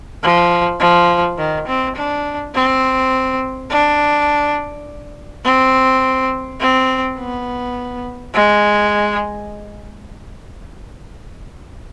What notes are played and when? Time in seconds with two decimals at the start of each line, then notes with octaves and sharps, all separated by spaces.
0.23 F3
0.80 F3
1.38 D#3
1.67 C4
1.96 D4
2.54 C4
3.70 D4
5.44 C4
6.60 C4
7.18 B3
8.34 G#3